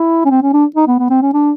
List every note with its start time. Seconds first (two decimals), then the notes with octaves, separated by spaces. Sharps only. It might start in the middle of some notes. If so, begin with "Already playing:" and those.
Already playing: E4
0.25 C#4
0.30 C4
0.42 C#4
0.53 D4
0.76 D#4
0.87 B3
0.99 B3
1.10 C4
1.22 C#4
1.33 D4